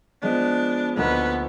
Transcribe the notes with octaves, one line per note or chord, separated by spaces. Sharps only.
F3 G#3 B3 D4
D2 D3 F3 A#3 B3 D#4